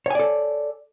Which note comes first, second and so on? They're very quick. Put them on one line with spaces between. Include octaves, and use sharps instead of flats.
C#5 G#5 D5 A4